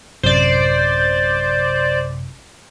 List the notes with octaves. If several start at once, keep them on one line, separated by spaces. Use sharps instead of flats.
A1 F#2 C3 C5 D5